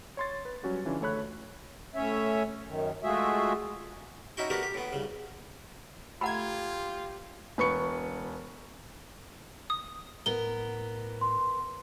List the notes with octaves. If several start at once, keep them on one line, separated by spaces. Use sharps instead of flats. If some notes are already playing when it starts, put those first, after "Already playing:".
C#5 C6 A6
B4
F#3 G3 C#4 F#4 G4
C#3 E3 C#4 D4 F4
D2 A3 A4 C#5 B5 F#6
A2 C#4 C#5 E5
F#2 D#3
G#3 A3 F4 F#4 G#4 E5
C#4 D#4 E4 F#4 G5
A3 B3 D4 F#4 G4 A#4
G4
A2 B3
C2 C#3
A3 F4 G4 F#5 A#5 B5 G#6
E1 B4 C#6 C#7
D#6
A2 B3 A#4 G7
C6